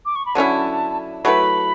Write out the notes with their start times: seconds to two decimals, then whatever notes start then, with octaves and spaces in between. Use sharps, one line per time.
0.05 D6
0.15 C#6
0.26 B5
0.35 D3 F#3 C#4 E4 A5
1.24 F#3 A3 E4 B4 B5